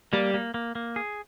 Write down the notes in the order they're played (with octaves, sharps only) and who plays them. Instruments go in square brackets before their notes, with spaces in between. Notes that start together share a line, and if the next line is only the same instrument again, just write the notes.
[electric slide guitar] G3 [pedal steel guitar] A#3
[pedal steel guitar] A#3
A#3
A#3
G#4